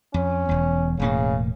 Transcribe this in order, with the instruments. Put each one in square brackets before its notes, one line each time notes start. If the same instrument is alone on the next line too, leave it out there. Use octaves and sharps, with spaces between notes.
[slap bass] F2 [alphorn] C#4
[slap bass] E1 E2
[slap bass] E1 A2 A#3 [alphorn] C#3